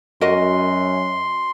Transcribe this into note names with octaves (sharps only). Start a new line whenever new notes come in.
F#2 F#4 A#4 D#5 C6